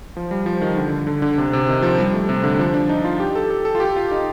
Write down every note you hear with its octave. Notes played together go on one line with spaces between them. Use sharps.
F3
G3
F3
D#3
D3
D3
D3
C3
C3
D#3
F3
G3
A3
C3
D3
F3
D4
D#4
F4
G4
A4
A4
A4
F4
G4
F4
D#4